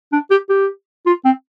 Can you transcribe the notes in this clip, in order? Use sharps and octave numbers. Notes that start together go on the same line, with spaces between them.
D4
G4
G4
F4
C4